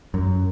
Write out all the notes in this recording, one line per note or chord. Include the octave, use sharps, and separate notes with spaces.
F#2